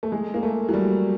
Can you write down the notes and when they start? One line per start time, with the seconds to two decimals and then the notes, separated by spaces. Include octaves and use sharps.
0.03 A3
0.12 G#3
0.34 A#3
0.43 A3
0.69 F#3
0.74 G3